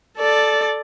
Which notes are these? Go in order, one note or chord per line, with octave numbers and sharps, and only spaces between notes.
A4 D5